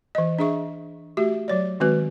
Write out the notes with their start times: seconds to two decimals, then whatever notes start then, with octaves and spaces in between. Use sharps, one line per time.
0.15 E3 D#5
0.39 D4 G#4 E5 C#6
1.17 A3 F#4 G4 E5
1.48 F#3 C#5 D5
1.80 D#3 G#3 C4 F#4 B4